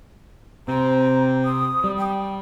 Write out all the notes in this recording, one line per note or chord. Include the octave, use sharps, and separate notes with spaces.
C3 C4 A#5
D#6
G3
G5